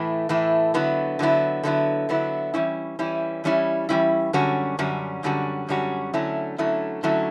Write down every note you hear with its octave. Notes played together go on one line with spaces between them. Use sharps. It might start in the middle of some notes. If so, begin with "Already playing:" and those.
Already playing: A2 E3 A3 E4
A2 E3 A3 E4
D3 F#3 B3 E4
D3 F#3 B3 E4
D3 F#3 B3 E4
D3 F#3 B3 E4
E3 G3 C#4 E4
E3 G3 C#4 E4
E3 G3 C#4 E4
E3 G3 C#4 E4
F#2 D3 G3 C#4 F#4
F#2 D3 G3 C#4 F#4
F#2 D3 G3 C#4 F#4
F#2 D3 G3 C#4 F#4
D3 F#3 A3 C#4 E4
D3 F#3 A3 C#4 E4
D3 F#3 A3 C#4 E4